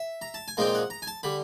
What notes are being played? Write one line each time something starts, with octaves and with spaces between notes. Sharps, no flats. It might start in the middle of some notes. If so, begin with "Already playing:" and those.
Already playing: E5
A#5
A5
G#5
A#2 F3 G#3 C4 D#4 G5
F#5
A#5
G#5
A5
D3 G3 B5